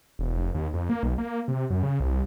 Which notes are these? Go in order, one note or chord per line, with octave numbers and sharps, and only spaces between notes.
E1
F1
D#2
F2
A#3
B1
A#3
C3
F#2
C#3
C2